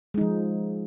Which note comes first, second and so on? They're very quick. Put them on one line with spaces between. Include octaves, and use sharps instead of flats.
G#3 D#4 F3